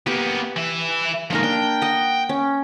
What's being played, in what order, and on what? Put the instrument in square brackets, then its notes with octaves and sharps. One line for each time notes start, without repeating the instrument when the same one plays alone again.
[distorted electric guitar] A#3 B3 [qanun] G4 B4
[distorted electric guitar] E3 E4
[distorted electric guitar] F3 G#3 [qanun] A#3 D#4 A#4
[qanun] D4 [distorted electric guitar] G5
[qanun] D#5 F#5
C#4